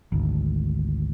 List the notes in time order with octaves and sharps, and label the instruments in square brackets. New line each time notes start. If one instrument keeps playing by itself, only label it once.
[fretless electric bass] G#1 D2